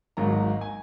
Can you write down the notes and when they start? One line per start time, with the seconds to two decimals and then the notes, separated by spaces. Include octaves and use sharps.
0.17 G#1 G#2 D#3 F#3 A#3 A#5
0.61 G#5